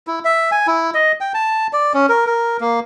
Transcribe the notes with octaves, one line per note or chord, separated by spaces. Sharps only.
E4
E5
G#5
E4
D#5
G5
A5
D5
C#4
A#4
A#4
A#3